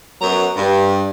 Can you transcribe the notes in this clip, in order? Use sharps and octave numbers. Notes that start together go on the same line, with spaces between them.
F#2 F#3 B3 A#5
G2